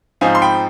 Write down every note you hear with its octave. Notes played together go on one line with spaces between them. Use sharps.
G#2 F3 C4 D#4 F5 G#5
C6
G5 B5